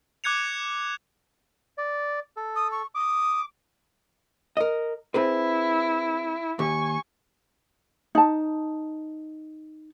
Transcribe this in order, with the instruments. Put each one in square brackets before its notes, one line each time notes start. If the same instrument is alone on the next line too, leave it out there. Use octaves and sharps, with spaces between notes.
[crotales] D6 F#6 G#6 C#7 F7
[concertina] D5
A4
[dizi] D#6
C#6
[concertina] D6 [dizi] D#6
[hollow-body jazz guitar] A#4 D#5
[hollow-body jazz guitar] C4 G#4 B4 [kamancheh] E4
[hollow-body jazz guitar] D#2 G4 [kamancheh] G#5 C#6
[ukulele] D#4 A5